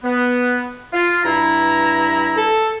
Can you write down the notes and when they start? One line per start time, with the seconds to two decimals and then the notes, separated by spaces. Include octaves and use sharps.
0.04 B3
0.93 F4
1.25 G2 E4 A#5
2.37 A4